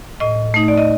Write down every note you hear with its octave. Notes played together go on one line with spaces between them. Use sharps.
A2 D#5
A3 D#4
D5
D#5